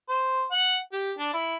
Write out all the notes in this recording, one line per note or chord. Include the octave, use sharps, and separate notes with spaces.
C5
F#5
G4
D4
E4